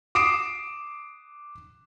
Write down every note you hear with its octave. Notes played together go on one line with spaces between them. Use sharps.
D6 D#6 C7 D7 E7